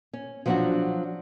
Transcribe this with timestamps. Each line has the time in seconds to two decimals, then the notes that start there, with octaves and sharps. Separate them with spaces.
0.13 C#4
0.46 F3 F#3 B3 C#4 D4 F#4